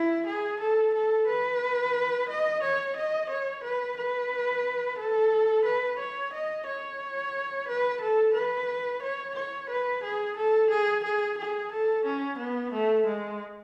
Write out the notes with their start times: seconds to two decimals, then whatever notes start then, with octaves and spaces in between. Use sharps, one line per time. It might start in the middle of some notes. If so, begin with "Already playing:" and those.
Already playing: E4
0.27 G#4
0.60 A4
0.94 A4
1.27 B4
2.29 D#5
2.63 C#5
2.96 D#5
3.30 C#5
3.63 B4
3.97 B4
4.98 A4
5.65 B4
5.98 C#5
6.33 D#5
6.66 C#5
7.68 B4
8.01 A4
8.34 B4
9.02 C#5
9.35 C#5
9.69 B4
10.03 G#4
10.36 A4
10.70 G#4
11.04 G#4
11.38 G#4
11.72 A4
12.05 C#4
12.38 B3
12.72 A3
13.06 G#3